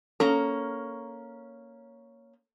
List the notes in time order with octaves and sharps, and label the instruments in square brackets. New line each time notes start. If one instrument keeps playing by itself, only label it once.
[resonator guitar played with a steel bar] A#3 C#4 A#5 [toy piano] A4